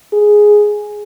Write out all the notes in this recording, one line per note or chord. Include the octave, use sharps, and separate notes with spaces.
G#4